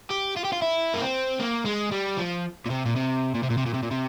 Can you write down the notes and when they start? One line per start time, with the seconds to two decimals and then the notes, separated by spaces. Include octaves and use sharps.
0.10 G4
0.36 F4
0.44 G4
0.52 F4
0.62 E4
0.94 A#3
1.01 C4
1.40 A#3
1.66 G#3
1.92 G3
2.18 F3
2.66 A#2
2.70 C3
2.86 A#2
2.96 C3
3.35 A#2
3.43 C3
3.50 A#2
3.57 C3
3.66 A#2
3.74 C3
3.83 A#2
3.91 C3